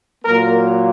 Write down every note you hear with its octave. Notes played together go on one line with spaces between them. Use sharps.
A#2 F#3 A#3 A#4